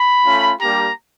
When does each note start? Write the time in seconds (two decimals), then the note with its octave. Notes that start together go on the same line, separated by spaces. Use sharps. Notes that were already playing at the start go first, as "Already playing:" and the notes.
Already playing: B5
0.25 A3 C#4 F4
0.60 G3 A#3 D4 G4 A#5